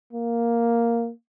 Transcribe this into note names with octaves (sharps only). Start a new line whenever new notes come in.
A#3